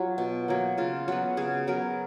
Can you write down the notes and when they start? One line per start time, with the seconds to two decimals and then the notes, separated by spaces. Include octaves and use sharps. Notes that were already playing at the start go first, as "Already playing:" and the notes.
Already playing: F#3 F4
0.18 B2
0.48 F#3 A#3
0.78 C#3 F4
1.08 F#3 B3 F#4
1.37 C#3 G#4
1.68 F#3 B3 A#4